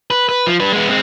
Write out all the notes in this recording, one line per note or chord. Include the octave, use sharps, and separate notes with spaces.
B4
B4
F3
G3 B4
G#3 B3
G#3 C4